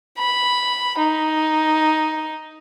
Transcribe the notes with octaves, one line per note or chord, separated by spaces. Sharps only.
B5
D#4